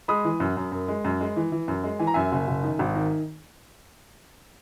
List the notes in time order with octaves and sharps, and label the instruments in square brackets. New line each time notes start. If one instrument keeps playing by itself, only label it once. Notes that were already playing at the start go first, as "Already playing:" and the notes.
[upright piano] G#3 B5 D#6
E3
F#2
F#2
F#2
G#3
F#2
G#3
E3
E3
F#2
G#3
E3 G#5
A#5
F#2 E5 G#5
F#1
F#1
D#3
G#1
D#3